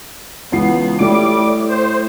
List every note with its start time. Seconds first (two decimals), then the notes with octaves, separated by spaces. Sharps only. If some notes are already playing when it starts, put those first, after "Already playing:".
0.52 C#2 E3 B3 C7
0.99 A2 G3 D6 D7
1.69 C5